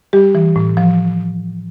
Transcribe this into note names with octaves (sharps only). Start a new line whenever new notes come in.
G3 G4
E3
A2
F3